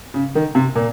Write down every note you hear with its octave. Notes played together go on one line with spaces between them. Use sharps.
C#3
D#3
C3
A#2